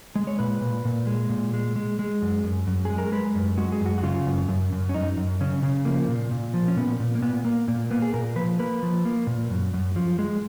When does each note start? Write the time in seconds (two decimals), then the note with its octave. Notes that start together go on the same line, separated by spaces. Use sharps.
0.16 G#3
0.27 C#5
0.39 A#2 B4
0.61 A#2
0.85 A#2
1.07 G#3
1.29 A#2
1.53 G#3
1.76 G#3
1.99 G#3
2.22 F#2
2.44 F#2
2.67 F#2
2.85 G#3 G#4
2.98 A#4
3.12 G#3 B4
3.35 F#2
3.58 G#3 F#4
3.72 G#4
3.81 F#2 F#4
3.98 F#4
4.03 C#3 F4
4.26 F#2
4.48 F#2
4.72 F#2
4.89 C#4
4.94 F#2 D#4
5.17 F#2
5.41 C#3 C#4
5.63 C#3
5.85 F3 A#3
6.08 A#2
6.31 A#2
6.54 F3
6.68 C#4
6.77 A#2 B3
7.00 A#2
7.15 A#3
7.22 A#2 B3
7.45 A#3
7.68 A#2 A#3
7.91 A#3 B3
8.02 G#4
8.14 A#2 A#4
8.36 F3 B4
8.59 A#3 B4
8.83 F3
9.05 A#3
9.27 A#2
9.51 F#2
9.74 F#2
9.96 F3
10.19 G#3